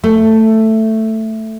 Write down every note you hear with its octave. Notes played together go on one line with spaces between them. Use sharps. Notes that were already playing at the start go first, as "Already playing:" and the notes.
A3